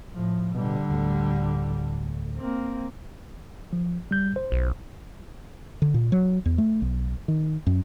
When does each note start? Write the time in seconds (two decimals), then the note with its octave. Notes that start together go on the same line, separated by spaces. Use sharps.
0.14 A2 F3
0.55 B2 D3 G3
0.90 D2 A2
2.36 A#3 C4
3.73 F3
4.11 G3 G6
4.36 C5
4.52 B1
5.82 D3
5.94 A#2
6.12 F#3
6.46 E2
6.58 A3
6.82 B1
7.28 D#3
7.67 F#2